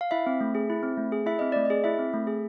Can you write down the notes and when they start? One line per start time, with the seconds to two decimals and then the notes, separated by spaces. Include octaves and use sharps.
0.01 F5
0.11 E4 E5
0.27 C4
0.41 A3
0.55 G#4
0.70 E4
0.83 C4
0.97 A3
1.12 G#4
1.26 E4 E5
1.39 C4 D#5
1.52 A3 D5
1.65 G#4 D#5
1.84 E4 E5
1.98 C4
2.13 A3
2.27 G#4